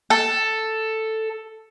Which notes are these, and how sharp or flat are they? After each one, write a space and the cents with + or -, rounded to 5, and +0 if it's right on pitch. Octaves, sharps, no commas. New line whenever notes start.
A4 +5